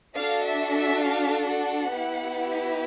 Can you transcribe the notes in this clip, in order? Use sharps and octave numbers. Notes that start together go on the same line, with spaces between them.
D4 F#4 A4 F5
E5
E5
F5
F#5
B3 E4 G4